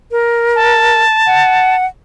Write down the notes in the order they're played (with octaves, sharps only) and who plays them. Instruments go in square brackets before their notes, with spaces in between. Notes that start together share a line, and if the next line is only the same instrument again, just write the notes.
[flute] A#4
[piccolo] A5
[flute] F#5